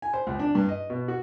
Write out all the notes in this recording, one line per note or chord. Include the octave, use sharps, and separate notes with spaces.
G#5
C5
C#2
D4
G2
D#5
B2
F#4